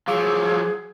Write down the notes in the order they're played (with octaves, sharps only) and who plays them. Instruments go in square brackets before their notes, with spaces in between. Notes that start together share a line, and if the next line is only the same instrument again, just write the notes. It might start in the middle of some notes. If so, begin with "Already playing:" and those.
[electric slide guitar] F3 F#3 [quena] G#4 [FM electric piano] F5 D6 E6